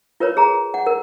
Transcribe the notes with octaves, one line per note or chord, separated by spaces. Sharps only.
F4 A#4 B4 C#5
G#4 A#5
F#5
A#4